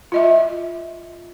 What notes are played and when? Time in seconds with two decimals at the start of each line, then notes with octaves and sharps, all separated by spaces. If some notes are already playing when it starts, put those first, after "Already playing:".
0.12 F4 D#5 E5